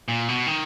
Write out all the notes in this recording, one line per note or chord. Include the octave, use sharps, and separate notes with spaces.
A#2
B2
D#3